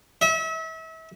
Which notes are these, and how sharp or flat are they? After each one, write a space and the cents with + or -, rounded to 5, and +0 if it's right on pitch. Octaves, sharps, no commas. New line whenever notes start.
E5 -35